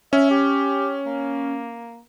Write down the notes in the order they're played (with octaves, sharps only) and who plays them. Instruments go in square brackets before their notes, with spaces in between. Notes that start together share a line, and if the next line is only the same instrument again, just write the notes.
[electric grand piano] C#4 [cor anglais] E5
[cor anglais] G4
A#3